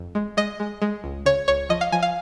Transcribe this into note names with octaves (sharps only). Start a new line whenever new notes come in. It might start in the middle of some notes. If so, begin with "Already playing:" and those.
Already playing: F2
G#3
G#3 D#5
G#3
G#3
C#2
C#3 C#5
C#2 C#5
F3 D#5
F5
F3 G#5
F5